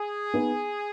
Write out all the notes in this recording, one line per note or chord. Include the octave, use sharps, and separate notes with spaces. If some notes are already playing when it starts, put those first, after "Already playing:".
Already playing: G#4
B3 D#4 B4